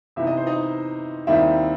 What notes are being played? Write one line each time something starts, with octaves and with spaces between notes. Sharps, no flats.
C3 E3 B3 D#4 E5
D#5
C5
D#4 D#5
D#2 D#3 G3 C4 D#4 E4 E5